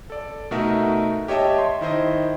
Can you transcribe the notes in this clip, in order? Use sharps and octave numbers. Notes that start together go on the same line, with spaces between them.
A4 D5
B2 A3 D#4 F#4 A#4 E5
G4 C#5 D#5 E5 G5 A5
C6
D#3 E4 C5 D#5